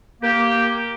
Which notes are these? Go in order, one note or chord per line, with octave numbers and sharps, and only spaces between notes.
A#3 G4